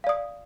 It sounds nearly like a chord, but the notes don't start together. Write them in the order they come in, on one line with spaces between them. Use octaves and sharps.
F5 D5 D#6